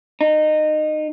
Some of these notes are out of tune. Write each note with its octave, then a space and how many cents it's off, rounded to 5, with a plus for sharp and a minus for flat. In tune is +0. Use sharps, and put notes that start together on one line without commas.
D#4 -20